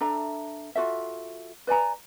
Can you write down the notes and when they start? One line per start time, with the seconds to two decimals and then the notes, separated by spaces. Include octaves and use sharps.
0.01 D4 A4 E5 A#5
0.75 F4 F#4 A4 E5
1.67 B4 D5 G#5 A#5